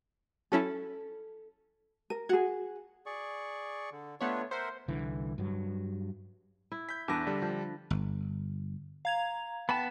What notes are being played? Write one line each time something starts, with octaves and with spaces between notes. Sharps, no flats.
F#3 C#4 E4 A4
A#4 D#7
F#4 G#4 F#5 G#6
G#4 D5 C#6
D3
A3 B3 D4 F4 C#5
A#4 C5 E5 F#5
C2 D3 E3
G2 F#3
E4
G6 B6
E2 D4 A4 B4 A#6
D3 G3
F3
G1
F5 A#5 G#6 F7
B3 G5 A5 B5